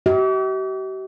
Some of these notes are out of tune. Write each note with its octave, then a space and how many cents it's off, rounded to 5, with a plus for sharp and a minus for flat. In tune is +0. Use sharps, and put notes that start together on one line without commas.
G4 -45 E5 -45